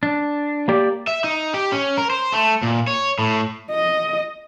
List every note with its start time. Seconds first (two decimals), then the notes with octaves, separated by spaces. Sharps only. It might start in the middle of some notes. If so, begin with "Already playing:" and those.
0.03 D4
0.68 A#3 G4 D5
1.07 E5
1.24 D#4
1.54 G4
1.72 C#4
1.98 A#4
2.10 C5
2.33 A3
2.63 A#2
2.87 C#5
3.19 A2
3.71 D#5